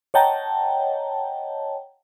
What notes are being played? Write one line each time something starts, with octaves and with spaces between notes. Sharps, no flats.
C#5 D#5 F#5 G5 A5 A#5